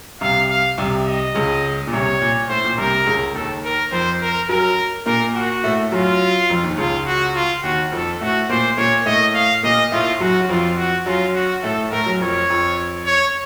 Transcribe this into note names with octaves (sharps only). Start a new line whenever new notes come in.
C2 C3 F5
F5
C2 C3
D#5
C#2 C#3
A#2
C2 C3 C#5
A#2
A2 C5
A#2
C2 C3 A#4
C#2 C#3
D#2 D#3 A4
A#4
F2 F3 C5
A#4
F#2 F#3 A#4
A#2 A#3 A#4
F#4
A2 A3
F#2 F#3 F4
F2 F3
D#2 D#3
C#2 C#3 F4
F#4
F4
D#2 D#3 F#4
F2 F3 A4
A2 A3 F#4
A#2 A#3 C5
A#2 A#3 C#5
A2 A3 D#5
F5
A#2 A#3 D#5
A2 A3 F4
F#2 F#3 F#4
F#3
F2 F3 F4
F#4
F#2 F#3 F4
F#4
A2 A3 A4
A2 A3 A#4
F#2 F#3
F2 F3 C#5
F2 F3
C#5